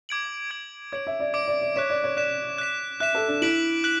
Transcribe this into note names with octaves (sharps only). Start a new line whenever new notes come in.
D6 G#6 D7 F#7
D6 G#6 D7 F#7
C#5 D6 G#6 D7 F#7
E5
D5
D5 D6 G#6 D7 F#7
D5
D5
C#5 F#6 B6 E7
D5
C#5
D5 F#6 B6 E7
F#6 B6 E7
E5 F#6 B6 E7
A4
D4
E4 F#6 B6 D7 F#7
F#6 B6 F#7